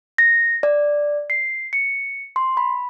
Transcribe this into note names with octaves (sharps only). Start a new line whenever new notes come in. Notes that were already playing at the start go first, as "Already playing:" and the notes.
A#6
D5
C7
C#7
C6
B5